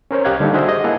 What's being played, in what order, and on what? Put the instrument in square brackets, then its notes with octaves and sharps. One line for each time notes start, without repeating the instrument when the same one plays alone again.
[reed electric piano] C#4 A#4 C5 C#5
C2 G4 D#5 F5 F#6 G#6
D3 G3 A#3 D4 D#4 A4
F#4 G#4 C5 D#5 E5
D#5
A#3 E4 G#4 F#5 A5